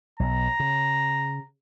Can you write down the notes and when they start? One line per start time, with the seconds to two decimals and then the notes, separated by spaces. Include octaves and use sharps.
0.20 B1 A#5
0.60 C#3